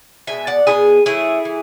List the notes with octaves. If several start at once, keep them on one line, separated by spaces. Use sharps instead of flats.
B2 G#3 B3 E5 G#5
D5 F#5
B2 G#3 B3 E4 G#4
E3 A3 C#4 E4 G#4
E3